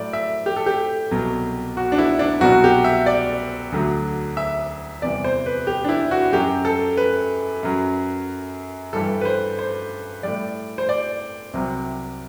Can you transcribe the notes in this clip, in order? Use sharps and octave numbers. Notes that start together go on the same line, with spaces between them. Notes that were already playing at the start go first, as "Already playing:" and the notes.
Already playing: A2 F#3 D5
E5
G4
A4
G4
C2 B2 F#3
F#4
D4
E4
D4
C2 B2 F#3 F#4
G4
E5
D5
D2 D3 F#3
E5
E2 C3 E3 G3 D5
C5
B4
G4
D4
E4
F#4
F#2 F#3 G4
A4
B4
F#2 F#3
G2 E3 G3 A4
B4
C5
C5
A2 G3 D5
C5
D5
C2 C3 F#3